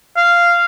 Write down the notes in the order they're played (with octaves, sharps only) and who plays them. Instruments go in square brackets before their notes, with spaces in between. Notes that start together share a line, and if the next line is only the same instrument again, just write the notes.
[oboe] F5